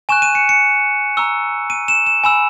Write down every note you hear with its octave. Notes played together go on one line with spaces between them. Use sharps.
G#5 C#6 F#6 E7
D#7
C#7
C#7
A#5 C#6 E6
D#7
E7
E7
G#5 B5 E6 E7